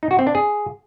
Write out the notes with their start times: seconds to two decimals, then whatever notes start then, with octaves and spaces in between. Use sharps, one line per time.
0.03 D#4
0.11 F#4
0.19 C4
0.27 D4
0.35 G#4